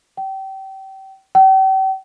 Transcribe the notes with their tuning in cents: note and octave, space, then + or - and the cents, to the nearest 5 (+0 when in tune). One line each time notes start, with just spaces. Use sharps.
G5 -30
G5 -40